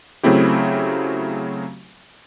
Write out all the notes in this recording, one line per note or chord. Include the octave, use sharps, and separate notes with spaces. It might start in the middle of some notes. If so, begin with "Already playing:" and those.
C#3 F#3 A3 C4 E4 G4